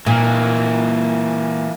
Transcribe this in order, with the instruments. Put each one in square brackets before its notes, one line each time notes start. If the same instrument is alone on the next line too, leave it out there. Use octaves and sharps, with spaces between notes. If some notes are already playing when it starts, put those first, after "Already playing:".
[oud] A#2 [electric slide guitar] E3 A#3